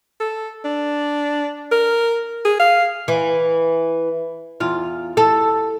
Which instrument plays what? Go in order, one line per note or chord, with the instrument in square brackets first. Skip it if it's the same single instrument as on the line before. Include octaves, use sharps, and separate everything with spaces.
[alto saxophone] A4
D4
A#4
G#4
F5
[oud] E3
E2 F4
A4